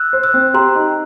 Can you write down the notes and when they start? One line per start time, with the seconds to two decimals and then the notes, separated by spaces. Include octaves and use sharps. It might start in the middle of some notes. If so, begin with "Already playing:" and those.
Already playing: E6 F#6
0.13 C5
0.23 E6 F#6
0.34 C4
0.54 G4 A#5 C6
0.75 D#4